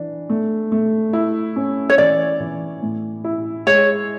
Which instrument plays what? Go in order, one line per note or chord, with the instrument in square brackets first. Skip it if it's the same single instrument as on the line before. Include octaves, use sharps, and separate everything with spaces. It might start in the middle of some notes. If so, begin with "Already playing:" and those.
Already playing: [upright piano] E3 D4
A3
A3
E4
C#4
[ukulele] C#5
[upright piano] E3 [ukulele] D5
[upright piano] E3
A2
E4
[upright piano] G#3 [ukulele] C#5